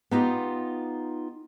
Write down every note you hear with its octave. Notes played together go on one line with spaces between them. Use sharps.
B3 D#4 F4 G4